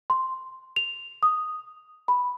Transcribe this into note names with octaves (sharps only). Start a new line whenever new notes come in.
C6
F7
D#6
B5